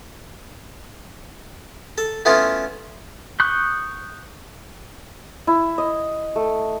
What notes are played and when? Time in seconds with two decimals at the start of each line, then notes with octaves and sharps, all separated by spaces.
1.98 A4
2.25 A3 B3 C#4 E4 F4
3.40 C#6 D#6 F#6 G6
5.47 E4
5.78 D#5
6.36 A3